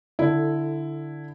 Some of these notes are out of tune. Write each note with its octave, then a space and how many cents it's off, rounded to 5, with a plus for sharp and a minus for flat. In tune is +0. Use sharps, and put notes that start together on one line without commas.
D3 +0 E4 +0 A4 +15